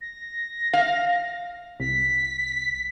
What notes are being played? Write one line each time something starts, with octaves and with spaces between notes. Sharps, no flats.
A#6
F5
C2 B6